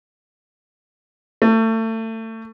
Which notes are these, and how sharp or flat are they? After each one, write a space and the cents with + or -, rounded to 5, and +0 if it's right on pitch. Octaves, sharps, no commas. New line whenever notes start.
A3 +30